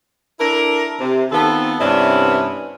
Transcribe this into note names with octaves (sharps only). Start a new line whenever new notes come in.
D4 E4 A4 A#4
C3
D#3 B3 C4 F4 A4
G2 C3 B3 C#4 D4 E4